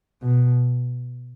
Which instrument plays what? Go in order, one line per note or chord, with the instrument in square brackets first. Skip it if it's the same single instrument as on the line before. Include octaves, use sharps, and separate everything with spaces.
[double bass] B2